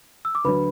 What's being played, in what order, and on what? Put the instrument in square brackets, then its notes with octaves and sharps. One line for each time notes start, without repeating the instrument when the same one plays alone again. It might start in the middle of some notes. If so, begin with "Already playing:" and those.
[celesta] E6
D6
[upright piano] D2 D3 F#3 [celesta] B4 B5